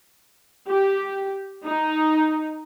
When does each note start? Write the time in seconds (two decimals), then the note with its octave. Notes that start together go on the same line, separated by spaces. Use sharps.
0.69 G4
1.66 D#4